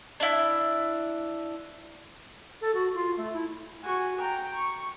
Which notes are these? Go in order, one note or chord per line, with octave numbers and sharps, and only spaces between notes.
D4 E4
A4
F#4
F4
A3
E4
F#4 G#5
G5 A#5
C#6